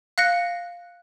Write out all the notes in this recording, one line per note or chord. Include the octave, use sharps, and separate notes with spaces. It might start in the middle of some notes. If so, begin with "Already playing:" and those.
F5 F#6 A#6 C#7